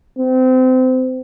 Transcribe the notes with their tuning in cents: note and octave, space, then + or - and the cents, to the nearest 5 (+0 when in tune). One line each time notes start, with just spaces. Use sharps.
C4 -30